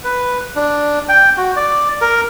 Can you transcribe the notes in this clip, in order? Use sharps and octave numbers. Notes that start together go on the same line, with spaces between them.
B4
D4
G5
F#4
D5
A#4